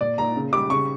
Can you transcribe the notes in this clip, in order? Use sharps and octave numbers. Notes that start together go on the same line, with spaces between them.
A#2 D5
A#2 A#5
C#3
G3 D6
C#3 C#6